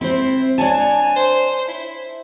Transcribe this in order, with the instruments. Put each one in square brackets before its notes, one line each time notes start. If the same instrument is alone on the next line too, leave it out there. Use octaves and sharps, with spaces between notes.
[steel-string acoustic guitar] C4 C5 [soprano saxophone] E4
[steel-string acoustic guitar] D4 C#5 A5 [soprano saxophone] G#5
[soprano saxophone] C5
E4